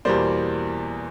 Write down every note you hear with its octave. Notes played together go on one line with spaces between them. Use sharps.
E2 B2 G3 A#3 C5 D5